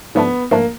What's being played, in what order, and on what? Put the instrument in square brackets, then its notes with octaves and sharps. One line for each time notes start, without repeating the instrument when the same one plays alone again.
[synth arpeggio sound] G#2 F3 A3 D4 [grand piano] B3
[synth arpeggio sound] G#2 F3 A3 D4 [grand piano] A#3